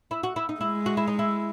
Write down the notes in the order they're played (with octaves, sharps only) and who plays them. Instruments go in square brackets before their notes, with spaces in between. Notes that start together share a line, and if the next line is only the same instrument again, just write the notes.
[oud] E4
F#4
E4
D#4
[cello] G#3 [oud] E4
[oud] F#4
E4
D#4
E4